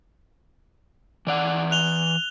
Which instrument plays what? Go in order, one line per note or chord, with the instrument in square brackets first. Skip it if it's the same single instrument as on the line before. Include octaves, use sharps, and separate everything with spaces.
[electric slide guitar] E3 D5 F#5
[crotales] F#6 F7 G7